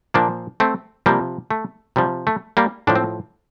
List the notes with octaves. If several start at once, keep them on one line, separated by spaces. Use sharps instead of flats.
A#2 F3 A#3 D4
A3 C4
C3 F3 G3 A#3
A3
C3 F3 G3
A3
G3 A#3
A2 F3 D4
C4